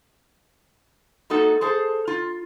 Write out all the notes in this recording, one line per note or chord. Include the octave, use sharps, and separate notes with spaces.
G#3 A#3 D#4 F#4 A4
G#4 A4 C5 A5
F4